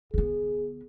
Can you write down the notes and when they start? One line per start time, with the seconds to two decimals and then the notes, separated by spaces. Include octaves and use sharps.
0.14 D3 B3 G#4